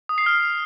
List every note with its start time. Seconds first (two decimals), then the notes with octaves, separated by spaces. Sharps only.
0.09 D#6
0.18 C7
0.26 F6